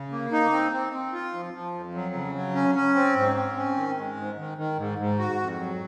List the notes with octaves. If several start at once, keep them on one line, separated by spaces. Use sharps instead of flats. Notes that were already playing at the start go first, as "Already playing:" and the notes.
Already playing: C#3
A#3
D#4
C4
C4
C4
F4
F3
F3
F2
F#3
C#3
F#3
C#4
C#4
C4
G#2
C4
C#4
D#3
G#3
G#2
D#3
D#3
G#2
G#2
F#4
F2
F#3